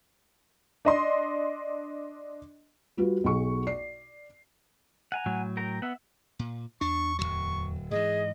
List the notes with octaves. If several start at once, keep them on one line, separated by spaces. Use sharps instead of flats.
D4 D#5 C6
G3 F4 F#4 B4
B1 G#4 C#6
D5 C7
F#5 G#5 A#5
A2 F#3
A#4 G5 A#5
B3 E5 F#5
A#2
E2 D4 C#6
D1 C#2 F#3 C#6
G#2 E3 G#4 D#5